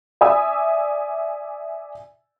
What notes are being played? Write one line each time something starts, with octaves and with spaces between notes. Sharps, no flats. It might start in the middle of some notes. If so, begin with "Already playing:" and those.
D5 E5 G#5 D#6 E6